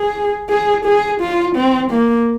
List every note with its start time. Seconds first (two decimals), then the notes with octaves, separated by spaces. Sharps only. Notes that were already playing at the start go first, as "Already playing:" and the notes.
Already playing: G#4
0.49 G#4
0.85 G#4
1.20 F4
1.56 C4
1.91 A#3